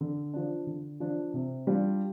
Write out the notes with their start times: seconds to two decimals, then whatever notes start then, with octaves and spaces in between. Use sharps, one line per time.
0.01 D3
0.34 F3 D4
0.67 D3
1.00 F3 D4
1.34 C3
1.67 G3 D4 F4